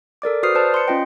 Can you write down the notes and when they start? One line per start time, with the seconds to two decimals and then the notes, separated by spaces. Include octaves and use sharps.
0.22 A4 A#4 D5 D6
0.43 F#4 B4 C5 D#6 F6 C7
0.55 B4 C5 D5 A5
0.74 C6 C#7
0.88 C#4 F4 D#5 G5